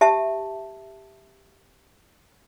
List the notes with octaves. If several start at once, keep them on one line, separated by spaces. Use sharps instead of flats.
G4 E5 A5